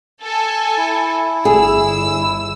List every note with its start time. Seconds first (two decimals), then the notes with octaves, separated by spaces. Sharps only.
0.23 A4 G#5
0.77 E4
1.45 G1 G#4 E6